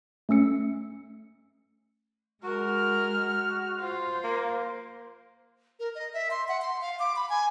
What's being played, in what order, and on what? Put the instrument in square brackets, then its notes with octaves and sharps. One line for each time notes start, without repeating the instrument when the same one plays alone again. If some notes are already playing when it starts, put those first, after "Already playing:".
[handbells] A3 C#4 E6 C#7
[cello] G#3 [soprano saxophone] F#4 [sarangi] A#4 [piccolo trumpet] F6
[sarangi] F4 [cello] C5
[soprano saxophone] A#3
[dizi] A#4
D#5
E5
C6
F#5
C6
F5
D6
B5
G#5